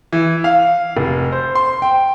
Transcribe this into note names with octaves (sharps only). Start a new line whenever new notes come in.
E3
F5
F1
C5
C6
G5